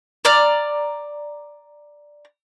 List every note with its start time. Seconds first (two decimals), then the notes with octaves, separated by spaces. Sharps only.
0.25 D5 A#5 F6